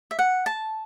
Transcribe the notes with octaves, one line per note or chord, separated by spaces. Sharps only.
E5
F#5
A5